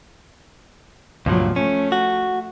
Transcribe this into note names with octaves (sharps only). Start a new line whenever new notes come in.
C#2 G2 A#2 F3 F#3
A3 C#4
F#4